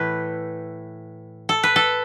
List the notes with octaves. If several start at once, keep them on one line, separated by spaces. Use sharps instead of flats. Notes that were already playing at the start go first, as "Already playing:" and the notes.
Already playing: A2 E3 A3 B4
A4
B4
A4